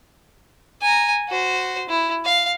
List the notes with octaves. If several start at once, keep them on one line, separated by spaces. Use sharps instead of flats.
G#5 A#5
F#4 C5
E4
F5